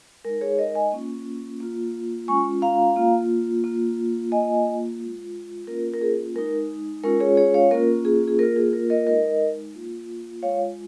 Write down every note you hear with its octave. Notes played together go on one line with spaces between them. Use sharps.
G#3 D#4 A#4
G#4 C#5
A#4 D#5
D#5 G#5
A#3 C#4 F4
A#3 F4
G#3 C#4 F4 G#5 C#6
F5 A#5
A#3 F4
A#3 F4
A#3 F4 D#5 G#5
G#3 F4
A#3 C#4 F4 A#4
A#4
G#4
G#3 D#4 A#4
G#3 C#4 F4 A#4
G#4 C#5
G#4 C#5
C#5 F5
A#3 C#4 F4 A#4
G#4
G#4
A#3 F4 A#4
G#4
A#4
A#4 D#5
G#3 D#4 A#4 D#5
A#3 F4
G#3 F4 C#5 F5